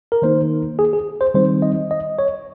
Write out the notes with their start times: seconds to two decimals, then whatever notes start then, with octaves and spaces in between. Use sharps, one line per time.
0.12 A#4
0.22 D#3 A#3 D#4 C5
0.79 G#4
0.93 G#4
1.21 C5
1.34 D#3 G3 C4 D#4 C5
1.62 D#5
1.91 D#5
2.19 C#5